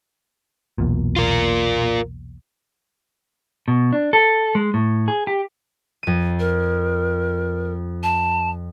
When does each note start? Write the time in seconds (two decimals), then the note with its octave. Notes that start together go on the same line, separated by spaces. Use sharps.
0.78 B1 E2 A#2
1.16 F4 A#4
3.68 B2
3.93 D4
4.13 A4
4.55 G#3
4.74 A2
5.08 G#4
5.27 G4
6.03 F2 D#7
6.40 A#4
8.03 A5